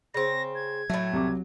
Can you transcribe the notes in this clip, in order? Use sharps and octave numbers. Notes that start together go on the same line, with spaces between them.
C#3 C4 A#6
G#6
A2 F#3 A3
C2 D6